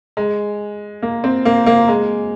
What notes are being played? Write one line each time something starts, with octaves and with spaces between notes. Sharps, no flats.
G#3
A#3
C4
A#3
A#3
G#3